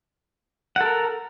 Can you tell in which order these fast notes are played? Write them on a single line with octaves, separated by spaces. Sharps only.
F#5 A4 A#4